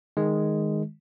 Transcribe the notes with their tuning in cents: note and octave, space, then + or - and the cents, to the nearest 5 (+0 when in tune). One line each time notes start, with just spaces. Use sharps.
D#3 -5 G#3 +0